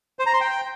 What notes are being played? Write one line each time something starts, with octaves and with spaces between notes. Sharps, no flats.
C5
A#5
C6
G5